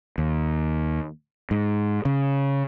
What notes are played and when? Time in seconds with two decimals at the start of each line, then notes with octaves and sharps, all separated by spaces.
0.18 D#2
1.51 G#2
2.05 C#3